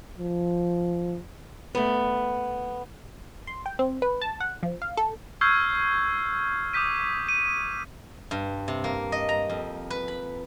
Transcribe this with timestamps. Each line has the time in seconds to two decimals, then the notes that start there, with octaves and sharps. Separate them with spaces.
0.18 F3
1.75 A3 B3
3.47 C6
3.66 G5
3.79 C4
4.02 B4
4.22 A5
4.40 F#5
4.63 F3
4.82 F5
4.97 A4
5.41 C#6 E6 F6 G6 G#6 C7
6.73 D6 D#6 G6 B6 D#7
7.29 D#7
8.31 G2
8.68 C3
8.84 A#3
9.12 D#5
9.29 A#5
9.50 F2
9.90 B4
10.08 B5